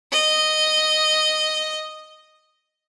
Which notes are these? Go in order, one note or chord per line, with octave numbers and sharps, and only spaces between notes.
D#5